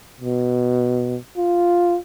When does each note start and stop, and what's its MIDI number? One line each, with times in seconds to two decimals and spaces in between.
0.20 1.17 47
1.37 1.97 65